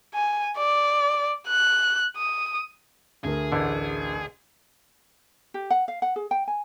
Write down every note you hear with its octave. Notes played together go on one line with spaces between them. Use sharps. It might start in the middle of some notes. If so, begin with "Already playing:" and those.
G#5
D5
F#6
D#6
D2 A3 G#4 A#4
A1 D3
G4
F#5
F5
F#5
G#4
G5
G#5